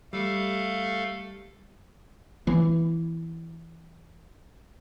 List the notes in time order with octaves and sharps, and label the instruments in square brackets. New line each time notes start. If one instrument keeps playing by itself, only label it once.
[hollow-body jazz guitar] G3 [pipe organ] A3 A4 F5
[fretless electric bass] E3 B3